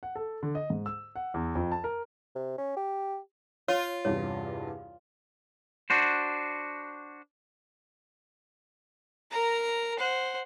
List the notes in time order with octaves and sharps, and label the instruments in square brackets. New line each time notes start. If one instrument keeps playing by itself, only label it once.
[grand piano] F#5
A4
D3
D#5
G#2
E6
F#5
E2
F2
A5
A#4
[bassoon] C3
C#4
G4
[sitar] F4 [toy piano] C#5
[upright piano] E2 G2 C3 [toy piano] C#5
[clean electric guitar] D4 F#4 C5
[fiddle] A#4 A#5
C5 F#5